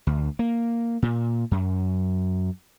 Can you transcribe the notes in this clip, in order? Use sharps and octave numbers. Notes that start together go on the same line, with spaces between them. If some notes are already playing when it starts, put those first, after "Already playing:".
D2
A#3
A#2
F#2